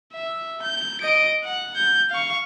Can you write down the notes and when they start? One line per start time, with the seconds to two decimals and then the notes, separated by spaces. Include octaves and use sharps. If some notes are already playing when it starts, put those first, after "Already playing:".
0.13 E5
0.62 G6
1.01 D#5 D7
1.44 F#5
1.75 G6
2.10 F5 C#6